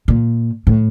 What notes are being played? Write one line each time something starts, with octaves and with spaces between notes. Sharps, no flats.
A#2
A2